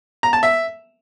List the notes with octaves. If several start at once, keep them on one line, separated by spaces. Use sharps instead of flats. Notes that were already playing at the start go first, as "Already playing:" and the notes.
A#5
A5
E5